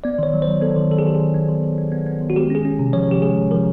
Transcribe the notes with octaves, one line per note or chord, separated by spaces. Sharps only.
B3 D5
D#3 C#5
F#3
C5
F#3
B3 A4
D#3
D#3 A4
G#4
D#3 G4
G#4
D#3
B3
D#3
D#3
B3
B3
B3
D#3
F#4
G#3 G4
C#4 G#4
C#4
C3
F3 C#5
C#4 G4
G#3 G#4
C3
F3 A#4